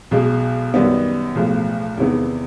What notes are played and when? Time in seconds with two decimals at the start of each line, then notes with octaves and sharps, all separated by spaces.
0.11 B1 B2 G#3
0.74 F#2 D#3 G3 B3 D#4
1.35 B1 A2 F3 G#3
1.97 E2 C3 D#3 G#3 B3